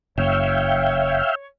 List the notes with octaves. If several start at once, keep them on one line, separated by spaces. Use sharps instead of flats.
F#1 F#2 C#5 E5 F5 G5